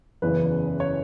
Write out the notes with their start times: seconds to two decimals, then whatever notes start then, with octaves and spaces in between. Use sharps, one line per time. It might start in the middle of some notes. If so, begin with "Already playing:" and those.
0.22 F#1 E2 C#3 E3 B4
0.80 C#5